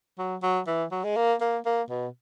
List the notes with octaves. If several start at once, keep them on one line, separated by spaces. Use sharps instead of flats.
F#3
F#3
E3
F#3
G#3
A#3
A#3
A#3
B2